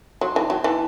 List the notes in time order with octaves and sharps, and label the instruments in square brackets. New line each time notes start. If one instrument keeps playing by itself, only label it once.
[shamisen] F#3 [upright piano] C6
[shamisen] E3 [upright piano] A5
[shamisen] F#3 [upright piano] G5
[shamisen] E3 [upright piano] A5